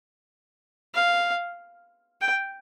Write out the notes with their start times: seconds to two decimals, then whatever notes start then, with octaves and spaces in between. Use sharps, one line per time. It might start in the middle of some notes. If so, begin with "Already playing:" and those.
0.95 F5
2.21 G5